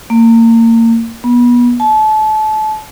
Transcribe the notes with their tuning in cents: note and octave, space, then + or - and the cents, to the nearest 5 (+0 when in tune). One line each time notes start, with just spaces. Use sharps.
A#3 -30
B3 -30
A5 -30